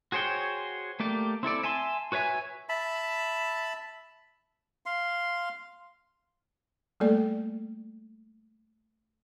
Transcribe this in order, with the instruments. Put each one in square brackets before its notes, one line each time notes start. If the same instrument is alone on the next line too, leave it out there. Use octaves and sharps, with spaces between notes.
[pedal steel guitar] F#4 G#4 C5 C#5 G5
A3 A#3 G4 D5
C4 E4 A4 D5
E5 G#5 A5 C6
F#4 B4 C#5 E5 G#5
[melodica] E5 A5 B5
F5 C6
[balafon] G3 A3 A#3 A4 D5